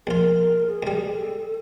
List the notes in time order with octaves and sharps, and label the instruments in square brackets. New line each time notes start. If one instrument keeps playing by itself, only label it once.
[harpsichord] A#1 F4 [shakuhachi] A#4
[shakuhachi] G#4
[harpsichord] C#2 G3
[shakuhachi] A4